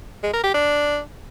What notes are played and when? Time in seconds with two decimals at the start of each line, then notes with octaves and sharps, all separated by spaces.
0.23 G#3
0.34 A#4
0.44 G4
0.54 D4